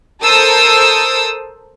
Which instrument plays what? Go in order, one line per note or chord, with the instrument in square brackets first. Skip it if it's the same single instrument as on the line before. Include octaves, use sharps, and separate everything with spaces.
[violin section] A4 A#4 C5 D#6 E6